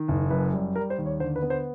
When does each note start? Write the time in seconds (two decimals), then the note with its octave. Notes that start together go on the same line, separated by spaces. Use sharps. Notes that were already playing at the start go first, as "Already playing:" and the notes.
Already playing: D#3
0.08 F#1
0.31 F#2 B4
0.53 G3
0.76 G3 A#4
0.90 C5
0.98 D#2
1.06 C#5
1.20 D3 C5
1.36 B4
1.42 B3
1.50 C5